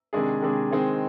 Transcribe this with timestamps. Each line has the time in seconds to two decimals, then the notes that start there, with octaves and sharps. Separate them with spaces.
0.13 C3 D#3 G#3 D4 G#4
0.42 C3 D#3 G#3 D4 G#4
0.71 D#3 G#3 C4 D#4 G#4